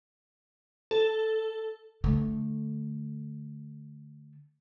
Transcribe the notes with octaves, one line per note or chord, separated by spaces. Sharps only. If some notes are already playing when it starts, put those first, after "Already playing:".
A4
D3 A3